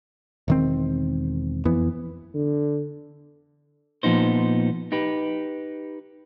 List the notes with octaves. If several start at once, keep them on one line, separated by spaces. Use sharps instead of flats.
E1 D#3 C4
F2 E3 B3
D3
A#2 F3 B3 D#4 C5
D#4 G4 B4